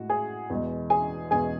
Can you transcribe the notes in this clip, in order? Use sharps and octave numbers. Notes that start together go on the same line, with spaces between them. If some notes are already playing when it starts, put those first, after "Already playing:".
Already playing: A2 G#3 F#4
G#4 G#5
E2 B2 G#3
G#4 G#5
E2 B2 G#3 G#4 G#5